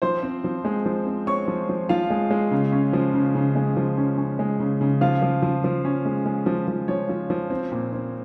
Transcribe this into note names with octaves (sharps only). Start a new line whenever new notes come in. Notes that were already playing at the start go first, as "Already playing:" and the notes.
F3 C5 C6
C4
F3
G#3
F3
C4
C4 C#5 C#6
F3
F3
F3 F4 F5
G#3
G#3
C#3
C#4
F3
C#3
C#3
G#3
F3
C#4
C#4
G#3
C#3
C#3
F3 F4 F5
F3
F3
F3
C#4
G#3
G#3
F3
F3
F3 C#5
F3
F3
C4
A#2
C4